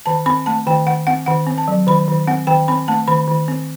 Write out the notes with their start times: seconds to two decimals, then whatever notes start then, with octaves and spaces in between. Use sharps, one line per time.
0.06 D#3 A5
0.26 C4 B5
0.46 A3 A5
0.66 D#3 G5
0.87 D#3 F#5
1.07 C4 F#5
1.26 D#3 F#5
1.46 C4
1.58 A5
1.68 F#3
1.87 D#3 B5
2.08 D#3
2.27 C4 F#5
2.47 D#3 G5
2.68 C4 B5
2.88 A3 A5
3.08 D#3 B5
3.27 D#3
3.48 C4